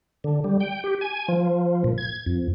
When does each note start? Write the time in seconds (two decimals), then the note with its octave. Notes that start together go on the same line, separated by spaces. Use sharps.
0.24 D3
0.44 G3
0.60 G5
0.84 G4
1.01 G#5
1.28 F3
1.84 A#2
1.98 G#6
2.26 F2